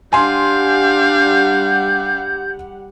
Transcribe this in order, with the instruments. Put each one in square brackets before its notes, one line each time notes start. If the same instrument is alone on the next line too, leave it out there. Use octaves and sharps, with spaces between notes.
[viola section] G3 G4 F#5 [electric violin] D4 F5 [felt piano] G#5 C6 [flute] G6